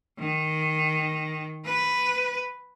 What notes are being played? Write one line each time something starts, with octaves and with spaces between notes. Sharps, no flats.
D#3
B4